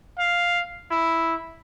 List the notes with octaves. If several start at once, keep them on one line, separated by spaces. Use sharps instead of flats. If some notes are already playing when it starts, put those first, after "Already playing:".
F5
E4